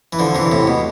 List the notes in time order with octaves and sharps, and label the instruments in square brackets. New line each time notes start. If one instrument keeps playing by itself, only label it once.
[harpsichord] E3
D3 F3
C3 E3
A2 C3
B2